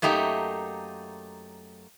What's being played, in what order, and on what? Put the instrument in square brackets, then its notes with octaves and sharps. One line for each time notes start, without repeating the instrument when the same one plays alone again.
[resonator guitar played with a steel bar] F#2 A3 A#3 D#4 G4